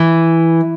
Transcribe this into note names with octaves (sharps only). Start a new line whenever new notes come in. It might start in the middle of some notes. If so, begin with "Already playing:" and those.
Already playing: E3